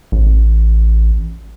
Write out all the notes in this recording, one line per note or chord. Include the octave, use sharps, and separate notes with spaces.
A1